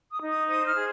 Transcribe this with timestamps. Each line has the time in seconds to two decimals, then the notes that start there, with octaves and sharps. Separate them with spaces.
0.11 D#6
0.21 D#4
0.30 D#6
0.48 C5 D#6
0.66 F6
0.75 G#4